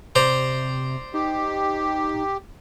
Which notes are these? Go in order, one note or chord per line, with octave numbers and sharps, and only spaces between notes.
C3 C5 D5 A#5
D#4 G4